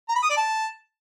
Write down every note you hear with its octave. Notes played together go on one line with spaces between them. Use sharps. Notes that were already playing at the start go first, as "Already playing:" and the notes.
A#5
B5
D#6
D5
A5